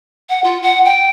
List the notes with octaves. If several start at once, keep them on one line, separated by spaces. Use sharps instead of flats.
F#5
F4
F#5
G5